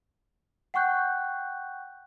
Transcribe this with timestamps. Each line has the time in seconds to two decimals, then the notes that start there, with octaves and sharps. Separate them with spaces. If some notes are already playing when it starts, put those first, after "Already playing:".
0.74 F#5 G5 C#6 F#6 G6